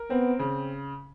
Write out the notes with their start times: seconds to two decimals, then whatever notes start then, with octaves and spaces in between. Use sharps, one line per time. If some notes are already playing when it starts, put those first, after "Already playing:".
Already playing: A#4
0.10 B3 C4
0.39 C#3